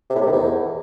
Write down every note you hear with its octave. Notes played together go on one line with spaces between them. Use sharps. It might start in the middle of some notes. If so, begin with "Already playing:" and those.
C3
A2
C3
D#3
E2